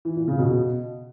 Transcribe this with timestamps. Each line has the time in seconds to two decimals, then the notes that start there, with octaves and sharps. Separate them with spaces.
0.05 E3
0.16 A#2
0.28 C#3
0.39 B2